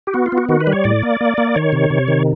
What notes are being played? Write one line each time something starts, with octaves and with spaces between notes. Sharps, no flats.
G4
B3 F#4
F4
B3
F#4
D#3 F#4
B4
G3
C#5
A2 D5
A#3
A#3
A#3
D#3 C#5
C3
C3
D#3